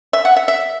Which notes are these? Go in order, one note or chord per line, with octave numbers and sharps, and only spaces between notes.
E5
F#5
E5
E5